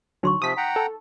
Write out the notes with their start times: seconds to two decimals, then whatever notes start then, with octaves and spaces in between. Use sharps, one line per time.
0.23 D2 F#3 D#4 C6 C#6
0.42 C3 F3 D#6 B6
0.57 F#5 G5 A#5
0.76 A4